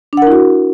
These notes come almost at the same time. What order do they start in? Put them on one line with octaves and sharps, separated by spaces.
D4 F#5 A#4 E4 F#4